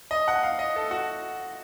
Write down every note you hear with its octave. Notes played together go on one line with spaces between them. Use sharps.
D#5
F#5
F5
D#5
A4
F#4